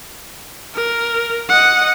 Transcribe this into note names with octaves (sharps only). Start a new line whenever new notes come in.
A#4
D#5 F#5